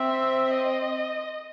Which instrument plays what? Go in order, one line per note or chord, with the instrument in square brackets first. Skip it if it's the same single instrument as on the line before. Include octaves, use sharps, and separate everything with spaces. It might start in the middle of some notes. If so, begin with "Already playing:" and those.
Already playing: [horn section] C4 [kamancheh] E5
[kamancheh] D#5